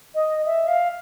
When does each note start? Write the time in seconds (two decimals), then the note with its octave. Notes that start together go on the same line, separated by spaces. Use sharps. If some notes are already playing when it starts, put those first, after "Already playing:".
0.14 D#5
0.45 E5
0.67 F5